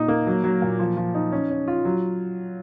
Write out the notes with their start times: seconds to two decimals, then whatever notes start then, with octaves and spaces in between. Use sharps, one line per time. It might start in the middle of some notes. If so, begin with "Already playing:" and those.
Already playing: A#2 D#4
0.08 A#3
0.27 F#3
0.44 F#3
0.62 A#2
0.79 F3
0.97 F3
1.15 D#4
1.32 C#4
1.50 C#4
1.68 F4
1.85 F#3